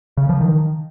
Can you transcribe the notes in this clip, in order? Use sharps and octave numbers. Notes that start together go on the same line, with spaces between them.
C#3
F3
D#3